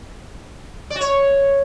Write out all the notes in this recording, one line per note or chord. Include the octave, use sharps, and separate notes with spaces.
D5
F#4
C#5